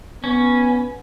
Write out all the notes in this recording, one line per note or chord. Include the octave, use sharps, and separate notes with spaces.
B3 C#4